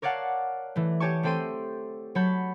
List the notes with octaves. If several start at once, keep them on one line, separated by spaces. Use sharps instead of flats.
A#4 C#5 D5 F5 F#5 A5
E3 A3
G4 C#5 G#5 A5 C#6
A3 C4 A4 G5 C6 D#7
F#3 C#5 A5 B5 G6